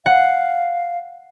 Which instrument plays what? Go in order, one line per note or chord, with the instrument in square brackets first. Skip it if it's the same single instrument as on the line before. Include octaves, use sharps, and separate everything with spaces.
[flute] F5 [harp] F#5